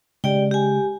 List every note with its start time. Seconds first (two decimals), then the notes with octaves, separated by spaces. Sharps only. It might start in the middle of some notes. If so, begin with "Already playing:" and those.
0.24 C#3 G#3 G4 D5 G5
0.51 G4 G#5